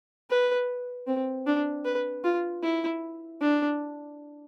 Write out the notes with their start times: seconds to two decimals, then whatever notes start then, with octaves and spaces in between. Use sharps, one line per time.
0.30 B4
1.07 C4
1.46 D4
1.85 B4
2.24 F4
2.63 E4
3.41 D4